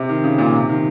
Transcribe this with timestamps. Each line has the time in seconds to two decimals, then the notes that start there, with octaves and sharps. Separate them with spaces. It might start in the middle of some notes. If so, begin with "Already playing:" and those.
Already playing: C3
0.09 D#3
0.24 C#3
0.38 A#2
0.54 C3
0.69 D#3